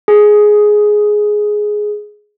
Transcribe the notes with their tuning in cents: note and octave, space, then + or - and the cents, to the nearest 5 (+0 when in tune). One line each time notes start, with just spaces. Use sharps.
G#4 +10